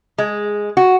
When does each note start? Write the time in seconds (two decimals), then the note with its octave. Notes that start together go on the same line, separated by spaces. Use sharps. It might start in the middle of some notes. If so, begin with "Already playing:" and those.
0.18 G#3
0.77 F#4